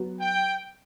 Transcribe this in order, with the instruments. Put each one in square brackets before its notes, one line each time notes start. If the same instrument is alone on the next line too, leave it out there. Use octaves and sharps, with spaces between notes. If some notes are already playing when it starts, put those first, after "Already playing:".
Already playing: [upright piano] F#3 B3 F#4
[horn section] G5